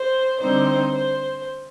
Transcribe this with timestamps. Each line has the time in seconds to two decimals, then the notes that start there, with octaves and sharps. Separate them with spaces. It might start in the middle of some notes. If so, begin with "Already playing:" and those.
Already playing: C5
0.40 D3 G3 C4 D#4 C5
0.95 C5